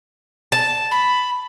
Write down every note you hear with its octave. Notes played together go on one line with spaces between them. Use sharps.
A5
B5